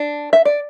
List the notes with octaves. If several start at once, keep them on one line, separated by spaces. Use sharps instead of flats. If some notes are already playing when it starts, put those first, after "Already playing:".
Already playing: D4
E5
D5